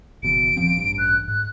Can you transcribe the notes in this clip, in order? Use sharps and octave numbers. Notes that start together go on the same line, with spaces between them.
F#1 B2 E3 D7
D#1 F3 C4
A1 G2
F#6
G#2 F#6